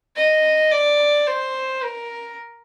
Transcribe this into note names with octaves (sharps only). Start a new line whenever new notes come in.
D#5
D5
C5
A#4